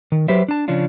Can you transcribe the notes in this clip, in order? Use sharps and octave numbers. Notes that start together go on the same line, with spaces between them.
D#3
F#3 G4 B4 C5 E5
D4 A5
C#3 F3 C#4 D4 F4